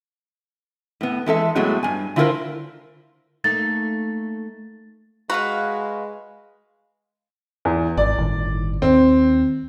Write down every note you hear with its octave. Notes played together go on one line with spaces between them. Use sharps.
A2 B3
E3 G#3 A4 E5
A2 F#3 G#3 A3 B3
G2 G#5
D3 E4 F4 G4 A#4 C5
A3 A#3 D#4 A6
G#3 F#4 B4 F5 B5
E2
G#1 D5
G1 A2 D#3
D#2 C4